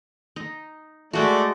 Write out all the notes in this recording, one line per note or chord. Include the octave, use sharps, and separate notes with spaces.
D#4
G#3 A3 F#4 D5